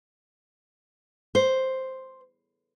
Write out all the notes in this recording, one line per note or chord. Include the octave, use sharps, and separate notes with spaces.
C5